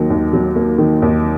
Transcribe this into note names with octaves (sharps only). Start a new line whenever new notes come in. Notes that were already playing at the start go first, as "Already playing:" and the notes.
Already playing: D#2 D#3 F#3 A#3
D#2
F#3
A#3
D#3
D#2